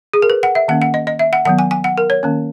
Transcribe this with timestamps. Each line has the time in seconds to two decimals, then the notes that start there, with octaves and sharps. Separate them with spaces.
0.14 G#4
0.22 A#4
0.30 B4
0.43 F#5
0.55 E5
0.68 D#3 A#3 C#4 F#5
0.82 F#5
0.94 D#5
1.07 D#5
1.19 E5
1.33 F#5
1.45 D#3 F#3 B3 F#5
1.59 G#5
1.71 G#5
1.84 F#5
1.98 A#4
2.10 C#5
2.23 D#3 A#3 C#4